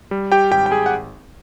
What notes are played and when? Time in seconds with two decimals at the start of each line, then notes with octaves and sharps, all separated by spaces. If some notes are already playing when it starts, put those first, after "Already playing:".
0.11 G3
0.32 G4 G5
0.51 G#1 G4 G5
0.66 G5
0.71 G#4 G#5
0.86 F#5